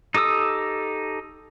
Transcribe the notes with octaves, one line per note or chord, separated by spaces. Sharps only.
D#4 G4 A4 D#6 E6